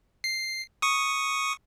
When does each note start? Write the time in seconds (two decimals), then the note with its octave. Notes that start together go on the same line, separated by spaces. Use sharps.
0.24 C7
0.82 C#6 D#6